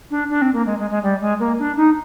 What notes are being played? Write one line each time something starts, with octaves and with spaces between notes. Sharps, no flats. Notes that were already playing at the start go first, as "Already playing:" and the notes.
D4
D4
C4
A#3
G#3
G#3
G#3
G3
G#3
A#3
D4
D#4